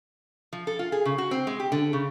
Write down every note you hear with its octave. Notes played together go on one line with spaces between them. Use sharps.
F3
A4
F4
G#4
C#3
F#4
C4
G#3
G4
D3
C#3